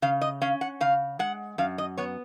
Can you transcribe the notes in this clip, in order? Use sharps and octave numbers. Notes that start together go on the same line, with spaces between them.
C#3 F5
D#5
C#4 F5
F#5
C#3 F5
G#3 F#5
F#2 F5
D#5
B3 C#5